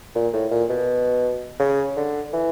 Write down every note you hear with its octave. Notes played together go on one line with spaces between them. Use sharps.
A#2
A2
A#2
B2
C#3
D3
E3